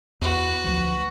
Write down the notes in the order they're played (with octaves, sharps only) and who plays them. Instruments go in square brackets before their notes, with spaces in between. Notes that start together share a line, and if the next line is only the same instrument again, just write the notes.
[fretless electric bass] E2 [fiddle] F#4 B4
[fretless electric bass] D2 F3 F#3